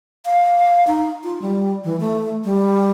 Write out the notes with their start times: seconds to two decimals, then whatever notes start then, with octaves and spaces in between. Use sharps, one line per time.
0.25 F5
0.87 D#4
1.24 F4
1.42 G3
1.84 E3
2.00 A3
2.45 G3